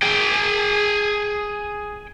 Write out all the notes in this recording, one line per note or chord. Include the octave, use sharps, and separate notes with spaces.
G#4 G5